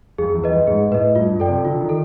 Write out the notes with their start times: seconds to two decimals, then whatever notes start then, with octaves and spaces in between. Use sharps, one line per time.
0.18 F2 G#4
0.35 E2
0.44 B4 D#5
0.51 F2
0.67 G#2 G#4
0.91 A2 B4 D#5
1.15 G2 F4
1.32 F#2
1.40 A4 D5 G5
1.48 C3
1.65 D3 F4
1.81 D#3
1.89 A4